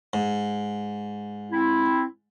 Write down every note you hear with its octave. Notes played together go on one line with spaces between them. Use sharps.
G#2
C4 E4